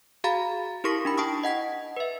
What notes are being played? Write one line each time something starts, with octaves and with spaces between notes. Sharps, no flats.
F#4 G#4 F5 A#5 B5 A6
E4 G4 A#4 C#6 A#6 B6
D4 D#4 B5
E4 G5 A5 C#6 D#6
D#5 F#5 G#6 B6
B4 E5